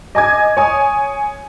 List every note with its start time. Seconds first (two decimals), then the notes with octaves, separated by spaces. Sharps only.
0.15 D#5 G#5 D6 G#6
0.57 C#5 G#5 D#6